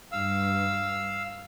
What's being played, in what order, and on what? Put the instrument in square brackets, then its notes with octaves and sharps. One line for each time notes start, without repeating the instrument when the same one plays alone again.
[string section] G2 [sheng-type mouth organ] F5 E6